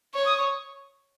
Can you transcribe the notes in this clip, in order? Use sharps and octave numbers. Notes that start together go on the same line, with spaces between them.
C#5 C#6
D#6
C#6